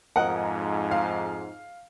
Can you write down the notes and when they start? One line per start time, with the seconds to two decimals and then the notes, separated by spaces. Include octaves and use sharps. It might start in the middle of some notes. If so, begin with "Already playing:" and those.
0.16 F2 G#2 A#4 D#5 F#5
0.91 F5